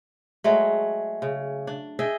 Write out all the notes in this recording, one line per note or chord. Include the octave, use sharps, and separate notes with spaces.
F#3 G#3 A3
C#3
D4
G#4 D#5 E5 G5